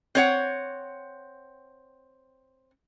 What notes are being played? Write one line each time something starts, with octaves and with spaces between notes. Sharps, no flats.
C4 C#5 F#5